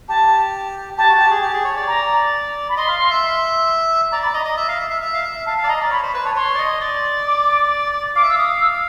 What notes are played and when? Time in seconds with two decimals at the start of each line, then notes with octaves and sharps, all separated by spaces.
0.09 G4 A5
0.98 G4 A5
1.09 F#4
1.20 G4
1.31 G#4
1.42 G4
1.54 G#4
1.65 C#5
1.76 D5
1.87 A#5
2.69 B5
2.77 D#5 C6
2.88 F5
3.00 F5
3.10 E5
4.12 D5 A#5
4.23 D5 B5
4.34 D#5 A#5
4.45 D#5
4.57 E5
4.68 F5
4.79 E5
4.90 E5
5.02 E5
5.14 F5
5.24 E5
5.46 F5 A5
5.58 F5 A5
5.64 D5
5.68 D#5 A#5
5.80 D5
5.91 C#5 B5
6.03 C5
6.14 B4
6.25 C#5 A5
6.36 C#5 C6
6.55 D5
6.58 D#5
6.81 D5
7.26 D6
8.16 F5 D6
8.23 E5
8.29 F5 E6
8.38 D#6
8.61 E6